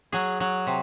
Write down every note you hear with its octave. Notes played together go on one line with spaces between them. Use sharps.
F#3 G#4
F#3
C3